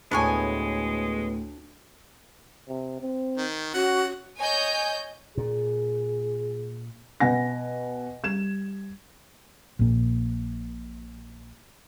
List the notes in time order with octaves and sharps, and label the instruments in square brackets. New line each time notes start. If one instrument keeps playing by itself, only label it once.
[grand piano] D2 A2 [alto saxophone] G#3 [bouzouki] B3 C#5 G#5 [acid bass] D4
[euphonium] C3
C4
[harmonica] D#3
[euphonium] C#4 [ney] F#4 [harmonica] F#5
[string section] C#5 D#5 G#5 G6
[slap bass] A#2 [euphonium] G#4
[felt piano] B2 B4 F#5 G#5 A#6
G3 G#6 E7
[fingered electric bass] A#1 A#2